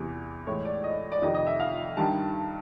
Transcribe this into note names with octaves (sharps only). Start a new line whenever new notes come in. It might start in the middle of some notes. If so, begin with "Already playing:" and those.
Already playing: E2 C3 E3
A2 E3 G#3 C#5
D5
D#5
D5
F2 C3 D#3 D#5
D#5
E5
F5
G2 D#3 G3 A5